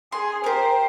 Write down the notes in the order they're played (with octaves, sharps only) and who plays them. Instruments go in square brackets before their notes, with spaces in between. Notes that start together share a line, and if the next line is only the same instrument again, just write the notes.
[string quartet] G#4 [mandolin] C6
[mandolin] G4 A#4 [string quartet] C5